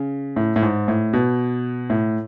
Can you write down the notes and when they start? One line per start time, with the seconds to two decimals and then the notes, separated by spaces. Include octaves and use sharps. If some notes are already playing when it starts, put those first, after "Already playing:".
Already playing: C#3
0.36 A2
0.56 A2
0.62 G#2
0.88 A2
1.13 B2
1.90 A2